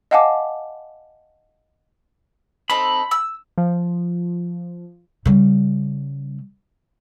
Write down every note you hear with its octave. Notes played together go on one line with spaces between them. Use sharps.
D#5 F5 F#5 G#5 A5 D6
C4 D#4 A4 B5
E6
F3
C#3 G3